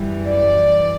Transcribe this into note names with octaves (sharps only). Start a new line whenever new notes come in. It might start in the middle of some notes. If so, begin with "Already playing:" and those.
Already playing: F#2 E3 G3
D5